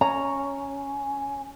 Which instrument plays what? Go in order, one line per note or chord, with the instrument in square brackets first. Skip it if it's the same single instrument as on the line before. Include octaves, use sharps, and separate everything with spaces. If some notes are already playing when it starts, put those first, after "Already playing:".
[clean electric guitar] C#4 [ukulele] A#5